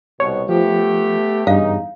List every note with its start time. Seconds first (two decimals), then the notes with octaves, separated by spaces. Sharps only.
0.20 C2 B2 C#5
0.49 F3 A3 B3 G4
1.47 E2 G2 C#3 D#4 F5